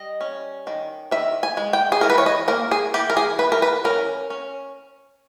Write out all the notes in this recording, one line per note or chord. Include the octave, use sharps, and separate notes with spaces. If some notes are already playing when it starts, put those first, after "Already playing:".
Already playing: G3 D#5
C#4
D#3
D#3 E5
G#5
G#3
G5
G#4
E3 A#4
B4
C#5
D#5
A#3 A#4
G#4
E3 G4
A#4
G#4
E3 B4
A#4
B4
C#4 A#4
C#4